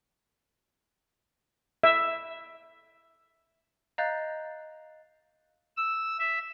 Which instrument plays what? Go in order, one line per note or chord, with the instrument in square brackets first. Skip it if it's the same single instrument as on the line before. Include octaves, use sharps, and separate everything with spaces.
[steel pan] E5
[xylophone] D#5 F5 A#5 F#6 G6 A6
[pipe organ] E6
E5